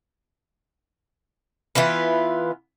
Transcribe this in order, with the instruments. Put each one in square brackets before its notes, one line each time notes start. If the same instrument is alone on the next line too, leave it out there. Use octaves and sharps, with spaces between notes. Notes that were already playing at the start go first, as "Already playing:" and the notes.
[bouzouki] E3 B3 F4 B4